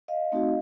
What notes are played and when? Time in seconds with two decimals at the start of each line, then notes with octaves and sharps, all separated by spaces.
0.08 D#5 F5
0.32 A3 C4 D#4 F#4